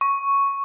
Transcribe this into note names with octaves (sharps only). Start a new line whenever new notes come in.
C#6